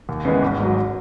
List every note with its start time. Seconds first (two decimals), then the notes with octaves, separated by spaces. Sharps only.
0.09 D#2
0.25 C#3 E3 G#3 B3
0.42 G#1
0.59 G#2 F#3